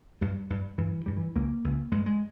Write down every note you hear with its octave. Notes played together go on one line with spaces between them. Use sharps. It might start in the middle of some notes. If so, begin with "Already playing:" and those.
G2 G3
G2
G2 E3
G2 G3
E3
C#2 C#3 A#3
C#2 C#3
G2 G#3
G#3